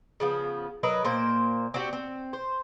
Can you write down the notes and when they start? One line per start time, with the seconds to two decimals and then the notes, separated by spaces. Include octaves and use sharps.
0.20 C#3 F3 B3
0.83 F#3 A#4 B4 D#5
1.04 A#2 A#3 C5
1.74 C4 D4 F#4 G4
1.93 C4
2.33 C5